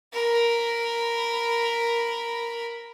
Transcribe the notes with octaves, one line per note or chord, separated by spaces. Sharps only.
A#4 B5